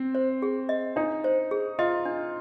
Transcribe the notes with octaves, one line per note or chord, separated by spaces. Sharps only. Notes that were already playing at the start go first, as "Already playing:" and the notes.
Already playing: C4
C5
G#4
D#5
D4 D#4
C5
G#4
F4 D#5
D4